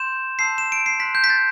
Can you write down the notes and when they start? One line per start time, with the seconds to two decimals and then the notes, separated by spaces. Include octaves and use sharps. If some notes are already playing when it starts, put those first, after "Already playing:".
Already playing: C6 G6 E7
0.39 A5 C6 E6 G6 C7
0.58 E7
0.72 D7
0.86 C7
1.00 C6 F#6 B6
1.15 G6
1.24 B6
1.30 A6